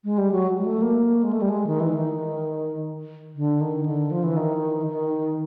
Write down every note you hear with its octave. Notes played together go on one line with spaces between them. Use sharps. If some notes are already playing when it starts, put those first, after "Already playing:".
G#3
G3
F#3
G#3
A3
A#3
G#3
A3
G3
G#3
D#3
E3
D#3
D3
D#3
D3
F3
E3
D#3
D#3